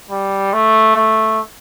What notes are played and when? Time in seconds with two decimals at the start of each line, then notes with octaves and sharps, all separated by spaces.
0.10 G3
0.53 A3
0.96 A3